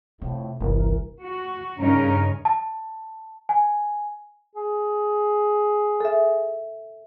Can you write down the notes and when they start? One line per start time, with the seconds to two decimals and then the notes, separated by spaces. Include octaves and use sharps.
0.22 F2 A2 C3
0.60 G1 C2 E3 A#4
1.22 F#4
1.78 G2 C#3 C#4 D#4 A#4
2.45 A5
3.49 G#5
4.56 G#4
6.00 A4 E5